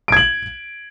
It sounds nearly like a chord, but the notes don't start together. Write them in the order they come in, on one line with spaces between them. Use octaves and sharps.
D7 G#6 F#7